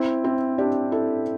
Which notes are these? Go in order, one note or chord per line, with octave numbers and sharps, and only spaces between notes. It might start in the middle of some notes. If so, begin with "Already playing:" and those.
Already playing: C4 E4
C4 E4
D4 G4
E4 A4